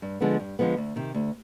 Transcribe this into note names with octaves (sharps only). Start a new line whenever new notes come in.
G2
D3 F3 G#3 B3
G2
D3 F3 G#3 B3
D2
C3 D#3
D2